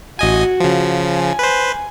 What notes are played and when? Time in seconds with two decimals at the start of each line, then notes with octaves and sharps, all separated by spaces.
0.19 A1 F#4 D#5 G#5
0.60 C#3 F3
1.03 G#5
1.39 B4 C5